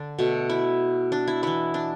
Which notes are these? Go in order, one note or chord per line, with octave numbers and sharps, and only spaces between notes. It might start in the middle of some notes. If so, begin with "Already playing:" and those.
Already playing: D3 D4
B2 A3
E4
D4
E4
E3 B3 E4
D4